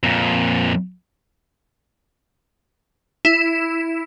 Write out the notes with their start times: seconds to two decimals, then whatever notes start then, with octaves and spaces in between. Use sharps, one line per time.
0.03 F2 A#2
3.25 E4